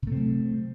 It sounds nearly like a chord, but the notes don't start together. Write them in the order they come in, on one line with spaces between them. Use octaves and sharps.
C3 A3 C4 F#3